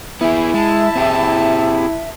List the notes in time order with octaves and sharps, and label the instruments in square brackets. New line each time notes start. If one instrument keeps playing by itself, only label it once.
[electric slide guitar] B3 G#4 [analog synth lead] E4 [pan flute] E5
[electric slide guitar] G#3 [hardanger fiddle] A5
[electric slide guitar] C4 G4 G#4